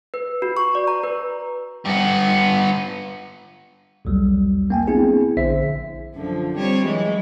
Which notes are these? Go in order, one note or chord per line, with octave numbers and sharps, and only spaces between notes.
B4
F#4
C#6
D5
A#5
B4
G2 B3
B1 E2 F#3 G3
A#3 G5 G#5
B3 C4 D4 E4 G#4
A#1 D3 C5 E5 B6
F#2 D3 F3
G3 C4 C#5
E3 F#3 G#3